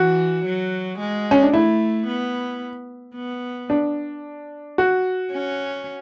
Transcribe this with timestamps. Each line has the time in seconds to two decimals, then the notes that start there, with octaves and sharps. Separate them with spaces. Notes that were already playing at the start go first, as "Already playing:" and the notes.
Already playing: E3 F#4
0.45 F#3
0.99 G#3
1.31 C#4
1.42 D4
1.53 A3 E4
2.07 B3
3.15 B3
3.70 D4
4.78 F#4
5.32 C#4